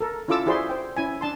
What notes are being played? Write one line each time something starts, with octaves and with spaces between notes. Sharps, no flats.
A4 A#4
C#4 E4 F4 A4 D6 E6
E4 F#4 G#4 C5 D5 C6
C5 G5
C#4 E4 G#5
D4 A5 C6